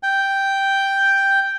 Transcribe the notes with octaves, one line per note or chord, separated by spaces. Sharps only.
G5